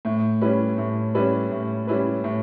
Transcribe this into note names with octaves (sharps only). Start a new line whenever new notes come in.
A2
G3 C#4 E4 B4
A2
G3 C#4 E4 B4
A2
G3 C#4 E4 B4
A2